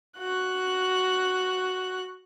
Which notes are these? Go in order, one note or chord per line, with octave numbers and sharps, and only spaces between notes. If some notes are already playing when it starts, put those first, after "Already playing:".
F#4 F#6